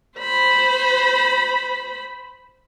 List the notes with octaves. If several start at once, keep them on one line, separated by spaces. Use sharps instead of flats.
C5 B5